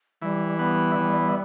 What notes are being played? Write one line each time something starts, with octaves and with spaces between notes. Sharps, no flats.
E3 G3
G3 B3
E3